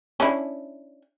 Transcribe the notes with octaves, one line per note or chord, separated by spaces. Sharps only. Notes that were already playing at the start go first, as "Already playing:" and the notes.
C#4 D4 E4